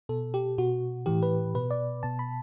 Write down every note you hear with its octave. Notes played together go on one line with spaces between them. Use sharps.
B2 A4
G4
B2 F#4
A2 E3 G4
B4
B2 B4
D5
B2 A5
B5